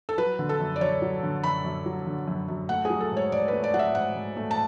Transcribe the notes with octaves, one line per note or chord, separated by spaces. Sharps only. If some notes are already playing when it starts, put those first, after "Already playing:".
A4
F#3 B4
D3
A4
F#2
D5
F#2 C#5
F#3
D3
F#2 B5
F#2
F#3
D3
F#2
F#2
A3 F#5
G#4
F#3
A4
G#2
C#5
G#2 D5
A3 B4
D5
F#3 F#5
E5
G#2 F#5
G#2
A3
A5